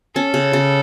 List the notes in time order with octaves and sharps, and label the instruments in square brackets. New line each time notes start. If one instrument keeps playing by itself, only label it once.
[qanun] C#4 [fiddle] A4
[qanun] C#3
C#3